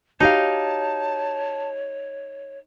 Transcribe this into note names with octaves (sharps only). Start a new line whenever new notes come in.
D#4 F#4 G4 C#5 F5 A5